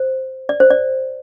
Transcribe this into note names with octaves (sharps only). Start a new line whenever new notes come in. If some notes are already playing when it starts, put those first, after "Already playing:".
Already playing: C5
D5
C5
D5